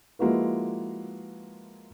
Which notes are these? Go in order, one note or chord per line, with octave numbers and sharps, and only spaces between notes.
F3 G#3 A#3 E4 F#4 B4